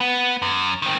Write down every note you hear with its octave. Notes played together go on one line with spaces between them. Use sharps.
B3
F#2
D#3 C4